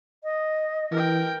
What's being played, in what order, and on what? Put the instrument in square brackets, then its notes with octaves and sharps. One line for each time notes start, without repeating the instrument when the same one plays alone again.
[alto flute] D#5
[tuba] E3 [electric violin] A#4 G5